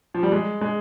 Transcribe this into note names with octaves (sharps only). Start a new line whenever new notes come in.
F3
G3
G#3
G#3